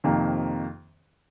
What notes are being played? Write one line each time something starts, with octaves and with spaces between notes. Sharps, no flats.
F2 C3 D#3 A#3